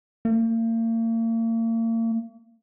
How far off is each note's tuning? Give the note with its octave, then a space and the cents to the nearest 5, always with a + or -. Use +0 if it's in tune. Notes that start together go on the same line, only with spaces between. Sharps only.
A#3 -40